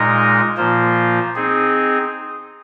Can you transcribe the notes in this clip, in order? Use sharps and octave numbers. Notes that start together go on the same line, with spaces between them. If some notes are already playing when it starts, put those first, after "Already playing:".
Already playing: A#2 G#3 D#4 A#4 D#5
A#2 F3 A#3 F4 C5
C4 D#4 G#4